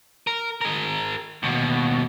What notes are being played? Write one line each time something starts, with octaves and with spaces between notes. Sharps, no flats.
A#4
G#4 A#4
D#2 B2